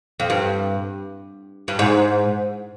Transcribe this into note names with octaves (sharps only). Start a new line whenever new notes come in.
F2
G2
G2
G#2